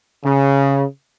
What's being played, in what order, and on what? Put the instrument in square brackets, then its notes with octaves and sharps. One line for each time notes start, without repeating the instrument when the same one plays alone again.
[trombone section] C#3